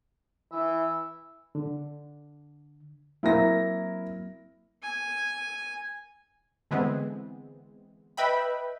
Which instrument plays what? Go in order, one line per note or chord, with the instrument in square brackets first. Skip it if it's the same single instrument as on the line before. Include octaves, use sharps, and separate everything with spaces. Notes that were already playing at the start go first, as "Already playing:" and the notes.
[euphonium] E3 [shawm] E5
[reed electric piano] D3
[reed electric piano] F#3 A#3 C4 [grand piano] E4 A#4 A#6
[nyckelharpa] G#5
[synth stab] D3 E3 G#3 B3 C4
B4 D#5 E5 G5 B5